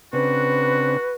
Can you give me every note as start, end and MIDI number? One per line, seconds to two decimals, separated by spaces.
0.13 0.97 49
0.13 0.97 60
0.13 0.97 62
0.13 1.15 66
0.13 1.15 71